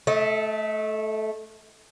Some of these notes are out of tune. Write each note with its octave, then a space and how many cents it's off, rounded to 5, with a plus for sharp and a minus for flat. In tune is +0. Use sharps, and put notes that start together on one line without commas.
A3 -10 D#5 +40